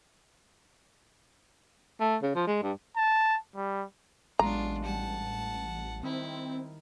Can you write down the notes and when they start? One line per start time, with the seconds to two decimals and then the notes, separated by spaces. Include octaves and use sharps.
2.00 A3
2.23 C#3
2.35 F3
2.47 G#3
2.63 G2
2.96 A5
3.56 G3
4.39 A1 F#3 G#3 B3 D4 F4 A#5
4.85 G3 F#5 A5
6.03 D#3 C4 E4 B5